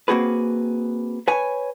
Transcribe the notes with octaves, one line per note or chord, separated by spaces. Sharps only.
A#3 C4 F#4 G#4 B4
B4 C#5 G#5